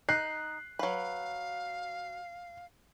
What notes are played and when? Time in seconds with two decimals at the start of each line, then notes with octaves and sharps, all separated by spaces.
0.09 D#4 F#6 C7
0.79 F#3 B4 F5